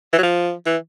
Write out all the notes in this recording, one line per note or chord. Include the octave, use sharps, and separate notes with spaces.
E3
F#3
F3
E3